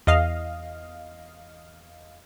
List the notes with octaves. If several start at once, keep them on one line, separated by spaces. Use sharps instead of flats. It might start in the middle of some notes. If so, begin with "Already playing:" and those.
E2 D#5 F5